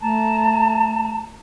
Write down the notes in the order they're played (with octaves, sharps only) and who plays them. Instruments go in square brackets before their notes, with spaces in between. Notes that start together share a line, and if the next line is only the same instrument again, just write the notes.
[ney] A3 [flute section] A5 A#5